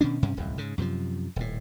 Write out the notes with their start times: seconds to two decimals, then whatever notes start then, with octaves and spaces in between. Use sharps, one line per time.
0.01 B2 D#3 C#4 D4
0.23 G2 C3 G3 C#4
0.37 D1 C2 F#2
0.58 G#2 C#3
0.78 F#2 C3 D#3 F3
1.36 D#1 A2